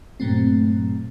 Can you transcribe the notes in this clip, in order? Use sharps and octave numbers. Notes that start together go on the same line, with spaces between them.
G2 A#2 F#3 A3 C4